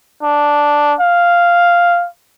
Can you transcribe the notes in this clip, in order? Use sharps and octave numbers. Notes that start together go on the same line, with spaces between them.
D4
F5